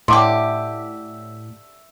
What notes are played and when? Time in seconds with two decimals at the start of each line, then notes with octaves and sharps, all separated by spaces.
0.08 A2 D3 G4 E5 C6 D6